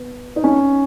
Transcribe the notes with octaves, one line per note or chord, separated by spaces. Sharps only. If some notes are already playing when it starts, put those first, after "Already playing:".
Already playing: B3
D#4
C#4